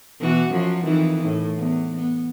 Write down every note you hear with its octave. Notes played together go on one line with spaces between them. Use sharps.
B2 E3 F#4
F#2 F3 F#3
F2 D#3 E3
A2
E2
B3